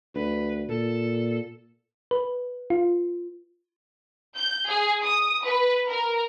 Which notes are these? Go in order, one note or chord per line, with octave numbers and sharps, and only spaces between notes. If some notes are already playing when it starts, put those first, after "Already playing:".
D2 B4
A#2 A4
B4
F4
G6
G#4
D#6
B4
A#4